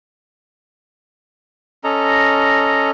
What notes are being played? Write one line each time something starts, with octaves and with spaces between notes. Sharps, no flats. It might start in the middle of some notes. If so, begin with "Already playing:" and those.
C#4 A4 D#5 A#5